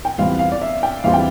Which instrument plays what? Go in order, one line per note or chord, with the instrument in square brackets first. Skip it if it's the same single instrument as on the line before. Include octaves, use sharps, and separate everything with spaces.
[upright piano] G5
[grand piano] E2 E3 G3 C4 F4 [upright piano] F5
[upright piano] F5
D5
E5
G5
[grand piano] E2 E3 G3 C4 F4 [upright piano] F5
[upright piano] G5